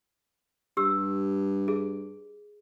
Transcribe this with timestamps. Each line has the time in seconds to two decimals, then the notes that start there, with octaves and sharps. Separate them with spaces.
0.77 G2 G4 E6
1.68 G#4